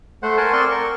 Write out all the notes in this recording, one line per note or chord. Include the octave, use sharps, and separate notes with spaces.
A3 C5 F#5
A#4 C5 F#5 G#5 A5
C4 A#4 D5 C6 C#6
A#4 C#6